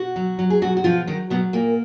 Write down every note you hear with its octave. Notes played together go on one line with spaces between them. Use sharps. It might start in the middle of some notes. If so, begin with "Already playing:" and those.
Already playing: B2 F#4
F#3
F#3
G#4
B2 F#3 F#4
F#4
B2 F3 F4
D#3 F#3 D#4
B2 F#3 B3
A#2 A#3